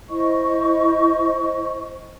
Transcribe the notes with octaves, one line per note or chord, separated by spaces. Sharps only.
E4 C5 D#5 C#6